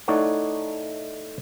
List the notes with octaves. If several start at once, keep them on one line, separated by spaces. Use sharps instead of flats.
A3 D#4 E4 C#5 D5 F#5